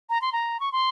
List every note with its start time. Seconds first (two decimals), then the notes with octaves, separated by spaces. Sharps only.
0.10 A#5
0.22 C6
0.33 A#5
0.60 C#6
0.72 C6